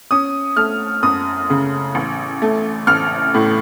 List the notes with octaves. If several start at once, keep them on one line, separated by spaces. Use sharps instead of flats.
C#4 D#6
A3 F6
F#2 D#6
C#3
A1
A3
A1 F6
A2